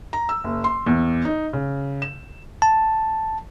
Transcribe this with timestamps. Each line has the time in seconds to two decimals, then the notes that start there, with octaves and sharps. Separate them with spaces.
0.13 A#5
0.29 E6
0.44 F#1
0.64 C6
0.87 E2
1.25 D#4
1.53 C#3
2.02 E7
2.62 A5